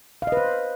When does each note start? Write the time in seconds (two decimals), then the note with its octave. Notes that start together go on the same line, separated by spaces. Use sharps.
0.22 F5
0.27 D#5
0.32 B4
0.37 C5